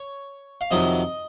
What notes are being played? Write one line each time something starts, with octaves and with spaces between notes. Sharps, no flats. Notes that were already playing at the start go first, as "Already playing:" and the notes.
Already playing: C#5
F5
F2 C3 D#3 F#3 D#5